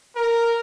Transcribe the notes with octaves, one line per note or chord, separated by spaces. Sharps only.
A#4